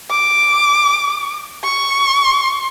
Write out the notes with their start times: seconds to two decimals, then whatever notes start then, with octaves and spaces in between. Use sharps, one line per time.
0.10 D6
1.64 C#6